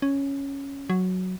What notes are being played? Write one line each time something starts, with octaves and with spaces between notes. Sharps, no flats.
C#4
F#3